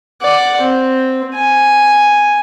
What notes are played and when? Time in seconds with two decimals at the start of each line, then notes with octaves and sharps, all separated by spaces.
0.21 D5 F#5
0.61 C4
1.34 G#5